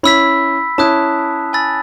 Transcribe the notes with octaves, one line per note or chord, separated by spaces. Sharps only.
C#4 E4 B5 E6 B6
C#4 E4 A5 D#6 F#6
G#5 B5 E6 A6